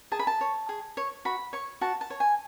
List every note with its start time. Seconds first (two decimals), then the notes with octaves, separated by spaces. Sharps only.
0.12 G#4 A5
0.19 B5
0.27 A5
0.41 C#5
0.69 G#4
0.97 C#5
1.25 F#4 B5
1.53 C#5 C#6
1.81 F#4 A5
2.01 A5
2.10 C#5
2.20 G#5